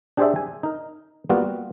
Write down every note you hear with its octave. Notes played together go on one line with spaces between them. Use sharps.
D4 G4 G#4 C5 D5 E5
G#5
D#4 A#4
G3 A#3 B3 F4 F#4